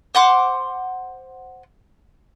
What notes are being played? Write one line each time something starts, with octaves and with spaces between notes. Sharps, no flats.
C5 F#5 C6 D6